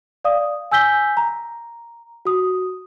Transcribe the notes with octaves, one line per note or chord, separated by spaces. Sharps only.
D5 F5 D#6
G#5 E6 G6 B6 G7
A#5
F#4 D#6